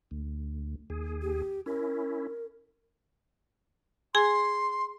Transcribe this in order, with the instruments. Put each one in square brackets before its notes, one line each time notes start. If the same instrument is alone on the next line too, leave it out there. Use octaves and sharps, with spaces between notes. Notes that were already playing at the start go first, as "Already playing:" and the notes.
[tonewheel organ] D2
D#2 G#4
[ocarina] G4
[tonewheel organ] C#4 E4 [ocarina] A#4
[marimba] G#4 G#5 [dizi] C6